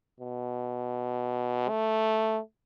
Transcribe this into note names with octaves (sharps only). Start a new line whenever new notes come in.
B2
A3